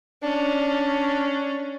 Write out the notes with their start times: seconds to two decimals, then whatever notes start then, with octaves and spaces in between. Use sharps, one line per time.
0.23 C#4 D4